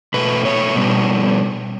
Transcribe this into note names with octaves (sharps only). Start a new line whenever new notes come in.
B2 A3 B4
C#5
B2 G3 B3